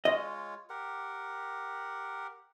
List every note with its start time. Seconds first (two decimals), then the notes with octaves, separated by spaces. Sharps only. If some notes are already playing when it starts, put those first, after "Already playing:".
0.05 G#3 F4 C#5 D#5
0.70 G4 A#4 F#5